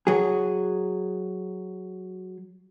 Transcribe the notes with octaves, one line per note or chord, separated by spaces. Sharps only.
F#3 G#4